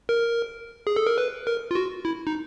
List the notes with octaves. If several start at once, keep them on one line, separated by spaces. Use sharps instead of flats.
A#4
G#4
A4
A#4
B4
A#4
F4
F#4
E4
D#4